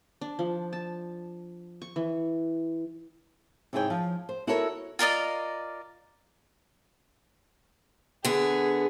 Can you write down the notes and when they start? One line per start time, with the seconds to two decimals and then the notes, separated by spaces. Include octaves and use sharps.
0.21 D4
0.39 F3
0.73 A5
1.82 C#6
1.96 E3
3.73 G#2 C3 E4 G#4 C#5 G5
3.90 F3
4.29 C5
4.47 E4 F#4 A4 A#4 C#5
4.99 F4 A#4 D5 D#5
8.25 D3 B3 G#4